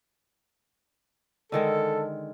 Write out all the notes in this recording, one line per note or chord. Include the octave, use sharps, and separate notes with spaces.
D3 D#3 G#3 A4